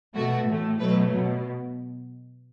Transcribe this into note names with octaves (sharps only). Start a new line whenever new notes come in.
B2 A3 F#4
A2 E3 A3
B2 F#3 A3 B4
B2